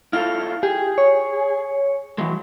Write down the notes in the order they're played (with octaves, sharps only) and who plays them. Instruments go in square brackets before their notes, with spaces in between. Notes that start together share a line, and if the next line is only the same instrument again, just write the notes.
[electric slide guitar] E4 F4 A4 [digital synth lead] F6
[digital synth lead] G4 [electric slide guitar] G#4
[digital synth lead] C#5
[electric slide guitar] E3 F#3 G#3